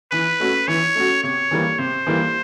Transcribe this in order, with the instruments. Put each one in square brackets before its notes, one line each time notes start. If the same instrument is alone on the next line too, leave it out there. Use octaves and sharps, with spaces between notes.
[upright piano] E3 [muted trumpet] B4
[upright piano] A3 C#4 F#4
[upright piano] E3 [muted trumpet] C#5
[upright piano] A3 C#4 F#4
[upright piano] C3 [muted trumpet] C#5
[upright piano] E3 G3 A#3
[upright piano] C3 [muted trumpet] C5
[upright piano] E3 G3 A#3